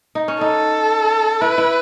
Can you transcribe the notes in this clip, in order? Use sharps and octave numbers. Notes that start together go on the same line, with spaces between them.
D#4
C#4
D#4 A4
E4 B4
E4